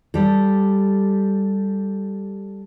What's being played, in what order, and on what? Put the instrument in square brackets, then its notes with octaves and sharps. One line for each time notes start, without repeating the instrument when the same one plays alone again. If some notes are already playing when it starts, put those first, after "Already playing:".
[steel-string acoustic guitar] G3 G4 A4